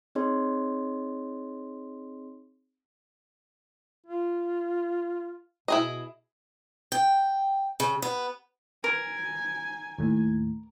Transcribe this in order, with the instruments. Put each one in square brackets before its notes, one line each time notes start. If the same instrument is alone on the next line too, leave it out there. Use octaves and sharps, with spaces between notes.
[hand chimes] C4 D#4 G#4 C#5 D#5 C6
[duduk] F4
[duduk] B2 [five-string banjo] E4 G#4 D#5
[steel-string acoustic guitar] G5
C#3
B3
[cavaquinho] A#4 [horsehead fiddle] G#5
[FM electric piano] D#2 A2